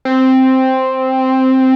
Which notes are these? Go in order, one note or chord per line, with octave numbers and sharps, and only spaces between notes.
C4